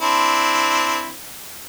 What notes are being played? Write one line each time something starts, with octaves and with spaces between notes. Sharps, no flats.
C4 D4 E4